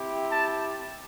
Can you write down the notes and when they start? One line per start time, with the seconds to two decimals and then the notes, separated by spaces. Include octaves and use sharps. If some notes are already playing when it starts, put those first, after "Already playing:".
Already playing: C4 E4 G4
0.30 A5